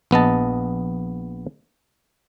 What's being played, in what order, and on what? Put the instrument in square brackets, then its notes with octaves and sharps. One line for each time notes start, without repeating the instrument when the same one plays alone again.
[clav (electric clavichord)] A#1 B3 D#5 A5